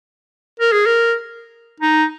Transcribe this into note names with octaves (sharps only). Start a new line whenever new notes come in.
A#4
G#4
A#4
D#4